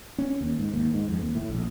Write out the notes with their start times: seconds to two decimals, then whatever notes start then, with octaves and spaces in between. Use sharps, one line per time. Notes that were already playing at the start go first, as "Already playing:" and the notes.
0.18 C#4
0.41 D#2
0.59 G#2
0.74 D#2
0.94 G#2
1.09 F2
1.21 D#2
1.35 A2
1.50 A#1